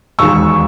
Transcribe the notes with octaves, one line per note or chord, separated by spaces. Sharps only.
E1 D#2 D#3 G#3 C#6 E6